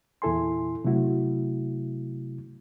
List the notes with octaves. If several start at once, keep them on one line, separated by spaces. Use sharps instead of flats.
E2 A#2 E4 A4 G#5 C6
C3 F#3 A3 E4 F#4